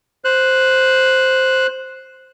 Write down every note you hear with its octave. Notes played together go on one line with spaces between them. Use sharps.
C5 F#6